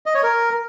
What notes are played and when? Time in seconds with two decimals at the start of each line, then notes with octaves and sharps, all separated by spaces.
0.06 D#5
0.15 C#5
0.23 A#4